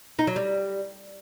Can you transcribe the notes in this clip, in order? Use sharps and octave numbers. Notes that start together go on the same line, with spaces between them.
D#4
F#3
G3